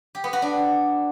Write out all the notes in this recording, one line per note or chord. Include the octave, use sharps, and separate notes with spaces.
G4
B3
F#4
D4